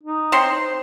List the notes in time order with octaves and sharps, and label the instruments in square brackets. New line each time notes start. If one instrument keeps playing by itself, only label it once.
[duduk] D#4
[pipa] C4 C#5 C6
[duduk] C5